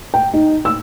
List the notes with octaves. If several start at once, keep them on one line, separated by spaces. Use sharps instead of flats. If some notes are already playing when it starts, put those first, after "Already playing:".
G5
D#4
E6